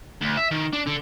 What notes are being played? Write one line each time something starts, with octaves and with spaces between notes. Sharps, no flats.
D2
E5
D#3
D4
D3